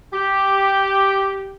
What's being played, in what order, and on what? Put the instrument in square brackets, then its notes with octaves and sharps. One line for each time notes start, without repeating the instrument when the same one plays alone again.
[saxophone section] G4